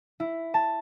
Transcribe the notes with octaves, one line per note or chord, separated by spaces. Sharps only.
E4
A5